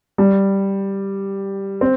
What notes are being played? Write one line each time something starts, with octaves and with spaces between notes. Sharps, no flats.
G3
C4